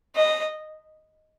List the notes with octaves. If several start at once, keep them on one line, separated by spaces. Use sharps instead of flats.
D#5